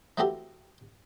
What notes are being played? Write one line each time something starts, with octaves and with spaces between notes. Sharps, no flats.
E3 A3 C4 F#4 G4 A4